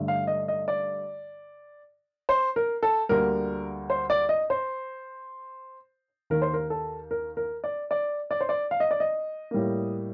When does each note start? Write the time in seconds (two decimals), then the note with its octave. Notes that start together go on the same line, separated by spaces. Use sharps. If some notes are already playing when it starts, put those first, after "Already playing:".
Already playing: G2 D3 A3
0.08 F5
0.27 D#5
0.48 D#5
0.68 D5
2.29 C5
2.56 A#4
2.83 A4
3.09 D2 D3 G3 A#3 A#4
3.90 C5
4.10 D5
4.29 D#5
4.50 C5
6.30 D#2 D#3 A#3 A#4
6.42 C5
6.54 A#4
6.70 A4
7.11 A#4
7.37 A#4
7.64 D5
7.91 D5
8.31 D5
8.41 C5
8.49 D5
8.71 F5
8.80 D#5
8.91 D5
9.00 D#5
9.51 A2 G3 A#3